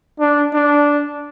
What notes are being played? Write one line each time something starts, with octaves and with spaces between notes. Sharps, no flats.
D4
D4